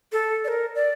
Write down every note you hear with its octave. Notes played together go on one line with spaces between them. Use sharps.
A4
D5
A#4
D5